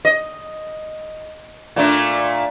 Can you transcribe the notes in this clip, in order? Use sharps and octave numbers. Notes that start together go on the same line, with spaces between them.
D#5
A#2 A3 D4